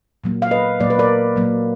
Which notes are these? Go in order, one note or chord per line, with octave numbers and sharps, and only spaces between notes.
A#2 F#3 A#3
F5
B4 D#5
A#2 F#3 A#3 D5
B4
A#4 D5
A#2 F#3 A#3